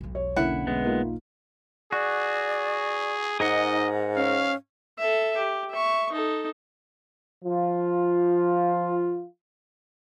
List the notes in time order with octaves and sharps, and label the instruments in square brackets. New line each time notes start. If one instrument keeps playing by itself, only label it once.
[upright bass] E1 B1
[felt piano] C#5
[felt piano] D3 A#3 C#4 [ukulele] E4 F#5
[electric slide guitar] G#3 B3
[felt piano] A#3 D#4 F4
[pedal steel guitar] F#4 [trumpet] G#4 [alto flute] D5
[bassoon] G#2 [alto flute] D#4 [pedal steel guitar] G#4 A#4 F#5 [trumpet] D#5
[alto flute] C#4 [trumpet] F5
[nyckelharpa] A4 E5
G4
E5 C#6
D#4 A4
[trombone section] F3 F4